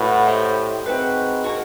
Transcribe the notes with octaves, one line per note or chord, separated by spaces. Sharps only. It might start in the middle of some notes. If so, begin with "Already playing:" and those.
Already playing: A2 F#4 B4 F#5
E4 G4 C5 D#5
G#2 C4 D#4 F#4 B4
A#3 D4 F#4